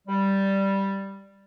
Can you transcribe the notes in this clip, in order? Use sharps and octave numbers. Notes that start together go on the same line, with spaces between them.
G3